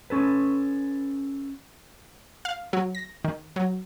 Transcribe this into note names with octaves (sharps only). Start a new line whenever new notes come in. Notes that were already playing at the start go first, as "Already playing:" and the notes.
C#4 A4 B4
F5
F#3
A#6
D#3
F#3